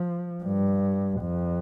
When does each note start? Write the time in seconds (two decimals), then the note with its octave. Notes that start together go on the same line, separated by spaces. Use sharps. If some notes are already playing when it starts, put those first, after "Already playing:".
Already playing: F3
0.44 G2
1.21 F2